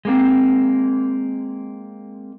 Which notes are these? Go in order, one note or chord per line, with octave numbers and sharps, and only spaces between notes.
G#3 A#3 C4